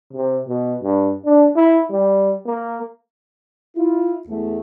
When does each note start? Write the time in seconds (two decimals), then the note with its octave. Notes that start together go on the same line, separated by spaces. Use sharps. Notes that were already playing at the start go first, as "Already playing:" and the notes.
0.13 C3
0.48 B2
0.83 G2
1.25 D4
1.56 E4
1.91 G3
2.45 A#3
3.76 E4 F4
4.28 E2 A3